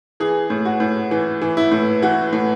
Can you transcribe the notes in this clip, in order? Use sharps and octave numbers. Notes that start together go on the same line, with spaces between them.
E3 G#4
A2
F#4
A2
E3
E3
E4
A2
E3 F#4
A2